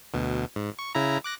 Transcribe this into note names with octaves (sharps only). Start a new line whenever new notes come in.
D2 B2
G#2
C#6
C#3 E4 A#5
D6 F#6 A#6